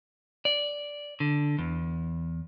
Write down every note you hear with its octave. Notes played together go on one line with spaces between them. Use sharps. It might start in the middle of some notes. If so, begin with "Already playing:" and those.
D5
D3
E2